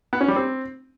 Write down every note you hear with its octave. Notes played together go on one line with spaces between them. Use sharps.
B3
C#4
G3
C4